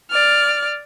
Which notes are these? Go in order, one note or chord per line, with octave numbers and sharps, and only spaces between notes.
D5 F6